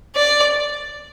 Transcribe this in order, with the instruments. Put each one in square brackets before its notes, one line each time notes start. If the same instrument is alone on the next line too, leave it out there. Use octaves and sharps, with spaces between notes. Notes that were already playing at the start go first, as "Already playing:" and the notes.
[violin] D5